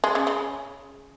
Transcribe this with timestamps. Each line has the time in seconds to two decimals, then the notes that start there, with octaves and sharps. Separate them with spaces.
0.04 G#3
0.15 C#3
0.27 C#3